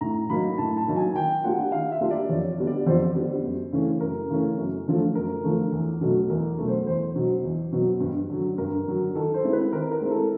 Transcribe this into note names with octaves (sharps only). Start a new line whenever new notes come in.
A2 A#5
F#3 A#3 D#4 B5
A2 A5
A5
F#3 A#3 D#4
G#5
D#3 G5
G3 A#3 D4 F4 F#5
D#3 F5
E5
G3 A#3 D4 F4
D5
F2 C#5
D3 G3 B3
D5
F2 C5
D3 G3 B3
F#2
C#3 E3 A3 C#4
F#2 A#4
C#3 E3 A3 C#4
F#2
D3 F3 A3
F#2 A#4
D3 F3 A3
E2
B2 F#3 A3
E2 A#4
B2 F#3 A3
C5
E2 C5
B2 F#3 B3
E2
B2 F#3 B3
G2
D3 F#3
G2 A#4
D3 F#3
D#3 A4
C5
G#3 C4 E4
B4
D#3 A#4
A#4
G#3 C4 E4
A4